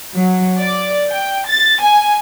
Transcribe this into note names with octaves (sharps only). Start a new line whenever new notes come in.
F#3
D5
G5
A6
G#5